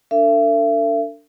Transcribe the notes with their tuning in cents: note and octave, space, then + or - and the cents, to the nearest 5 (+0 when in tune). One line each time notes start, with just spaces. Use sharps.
D4 -10 A4 +45 E5 +40